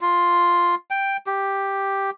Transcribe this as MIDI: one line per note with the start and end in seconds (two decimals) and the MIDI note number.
0.01 0.75 65
0.91 1.17 79
1.27 2.10 67